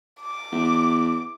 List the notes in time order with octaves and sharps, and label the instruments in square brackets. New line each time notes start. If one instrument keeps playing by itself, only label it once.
[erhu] D6
[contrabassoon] E2